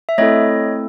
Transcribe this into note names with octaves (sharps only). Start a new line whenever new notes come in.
E5
A3 C4 E4 A4 C#5 D#5